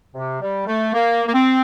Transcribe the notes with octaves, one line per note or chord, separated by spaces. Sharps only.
C3
G3
A3
A#3
A#3
C4